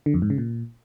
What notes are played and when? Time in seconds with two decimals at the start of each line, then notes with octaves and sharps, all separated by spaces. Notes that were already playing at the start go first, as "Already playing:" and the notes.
0.06 D3
0.14 F2
0.22 G#2
0.30 C#3
0.38 A#2